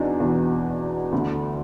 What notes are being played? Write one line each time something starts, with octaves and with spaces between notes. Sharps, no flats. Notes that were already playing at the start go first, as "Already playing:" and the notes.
Already playing: E2 B2 D4 D#4
E2 B2
D2 D3